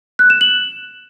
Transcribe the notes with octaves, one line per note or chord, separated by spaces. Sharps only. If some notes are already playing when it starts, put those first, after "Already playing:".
F#6
E7
F#7